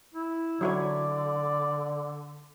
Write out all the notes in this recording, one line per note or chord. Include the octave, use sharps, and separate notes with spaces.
E4
D3 F#3 E4 C#5 D5